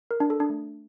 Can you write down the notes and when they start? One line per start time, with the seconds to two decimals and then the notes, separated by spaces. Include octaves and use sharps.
0.11 A#4
0.20 D4
0.30 A4
0.40 D4
0.50 A3